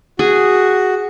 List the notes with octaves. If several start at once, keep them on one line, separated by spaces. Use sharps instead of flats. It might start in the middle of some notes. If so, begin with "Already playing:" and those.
F#4 G#4